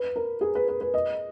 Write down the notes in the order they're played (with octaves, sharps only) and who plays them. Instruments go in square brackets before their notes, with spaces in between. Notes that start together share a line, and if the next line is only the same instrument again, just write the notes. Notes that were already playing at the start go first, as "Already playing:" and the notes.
Already playing: [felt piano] B4
A#4
G#4
B4
B4
B4
D#5